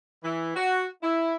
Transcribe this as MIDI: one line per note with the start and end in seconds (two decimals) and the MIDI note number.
0.24 0.54 52
0.55 0.85 66
1.03 1.35 64